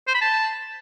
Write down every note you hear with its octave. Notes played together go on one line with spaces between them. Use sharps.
C5
B5
A5